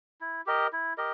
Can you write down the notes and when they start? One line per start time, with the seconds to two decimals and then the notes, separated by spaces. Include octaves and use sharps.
0.21 E4
0.46 G4 A#4 D#5
0.73 E4
0.98 G4 A#4 D#5